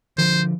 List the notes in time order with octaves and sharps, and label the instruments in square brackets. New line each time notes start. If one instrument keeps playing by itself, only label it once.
[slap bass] D3 F3 [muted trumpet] C5